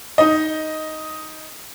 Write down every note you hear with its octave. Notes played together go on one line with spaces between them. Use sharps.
D#4 D#5